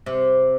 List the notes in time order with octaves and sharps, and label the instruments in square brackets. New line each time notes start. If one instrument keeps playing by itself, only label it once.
[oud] C3